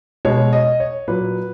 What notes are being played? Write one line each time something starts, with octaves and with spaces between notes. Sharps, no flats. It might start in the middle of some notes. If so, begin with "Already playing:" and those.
B2 G#3 C#5
D#5
C#5
A#2 F#3 B4